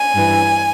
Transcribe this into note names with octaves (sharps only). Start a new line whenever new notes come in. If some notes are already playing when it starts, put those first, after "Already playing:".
Already playing: G#5
G2 E3